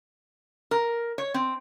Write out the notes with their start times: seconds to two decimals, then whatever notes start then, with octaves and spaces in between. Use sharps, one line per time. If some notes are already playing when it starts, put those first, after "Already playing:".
0.71 A#4
1.18 C#5
1.34 C4